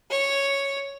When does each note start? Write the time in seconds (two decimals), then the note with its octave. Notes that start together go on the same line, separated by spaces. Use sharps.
0.10 C#5